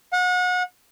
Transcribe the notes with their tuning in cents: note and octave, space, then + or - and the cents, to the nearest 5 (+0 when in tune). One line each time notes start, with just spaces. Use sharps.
F#5 -35